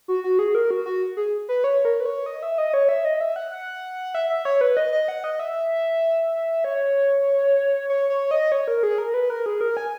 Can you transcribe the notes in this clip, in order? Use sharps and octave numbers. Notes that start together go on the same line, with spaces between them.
F#4
F#4
G#4
A#4
F#4
F#4
G#4
B4
C#5
A#4
B4
C#5
D#5
E5
D#5
C#5
E5
D#5
E5
F#5
F#5
E5
E5
C#5
B4
D#5
D#5
F#5
D#5
E5
C#5
C#5
C#5
D#5
C#5
A#4
G#4
A#4
B4
A#4
G#4
A#4
G#5